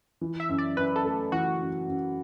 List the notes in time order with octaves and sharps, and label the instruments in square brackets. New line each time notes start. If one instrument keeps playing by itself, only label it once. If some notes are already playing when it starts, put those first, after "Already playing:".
[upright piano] E3
[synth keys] E5
[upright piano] F#2
[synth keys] D5
[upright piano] F#2 [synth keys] B4
[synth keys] A4
[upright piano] A3
[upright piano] E3 [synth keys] F#4
[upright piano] F#2
F#2